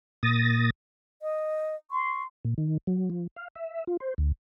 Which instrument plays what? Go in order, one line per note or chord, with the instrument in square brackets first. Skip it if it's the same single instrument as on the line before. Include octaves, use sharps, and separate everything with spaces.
[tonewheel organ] A#2 D#6 A6 A#6
[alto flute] D#5
[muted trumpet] C6 [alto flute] C#6
[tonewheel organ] A#2
D#3
F#3
F3
F5
E5
F4
C5
D2